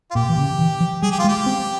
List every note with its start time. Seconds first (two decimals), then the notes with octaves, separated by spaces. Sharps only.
0.11 F4
0.15 A#2 G4
0.29 E3
0.37 C#3
0.59 E3
0.80 F3
1.02 G3 G#4
1.11 G4
1.19 F4
1.24 G#3
1.28 G4
1.46 C4